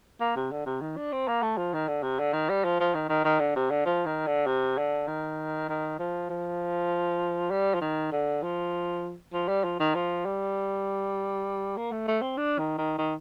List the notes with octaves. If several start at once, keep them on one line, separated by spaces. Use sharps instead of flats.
A#3
C3
D3
C3
D#3
D4
C4
A#3
A3
F3
D#3
D3
C3
D3
D#3
G3
F3
F3
D#3
D#3
D#3
D3
C3
D3
F3
D#3
D3
C3
D3
D#3
D#3
F3
F3
G3
F3
D#3
D3
F3
F3
G3
F3
D#3
F3
G3
A#3
A3
A3
C4
D4
D#3
D#3
D#3